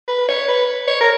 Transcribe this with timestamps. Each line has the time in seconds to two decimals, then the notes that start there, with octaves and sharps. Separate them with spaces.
0.08 B4
0.29 C#5
0.48 B4
0.88 C#5
1.01 A#4